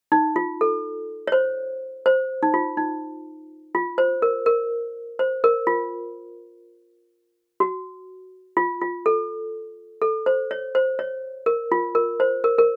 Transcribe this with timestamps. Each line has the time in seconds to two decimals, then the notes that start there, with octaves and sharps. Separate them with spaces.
0.12 D#4
0.36 F4
0.61 A4
1.27 C#5
1.32 C5
2.06 C5
2.43 D#4
2.54 F4
2.77 D#4
3.75 F4
3.98 C5
4.22 A#4
4.46 A#4
5.19 C5
5.44 A#4
5.67 F4
7.60 F#4
8.57 F4
8.81 F4
9.06 A4
10.02 A4
10.26 C5
10.51 C#5
10.75 C5
10.99 C#5
11.46 A#4
11.72 F4
11.95 A#4
12.20 C5
12.44 A#4
12.58 A#4